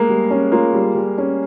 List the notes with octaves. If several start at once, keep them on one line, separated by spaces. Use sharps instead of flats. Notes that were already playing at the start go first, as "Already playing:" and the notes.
Already playing: G#3 A#3
G3
C#4
A#3 F4
G3
G3
C#4